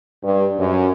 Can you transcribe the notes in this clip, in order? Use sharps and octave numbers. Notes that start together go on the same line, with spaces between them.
G2
F#2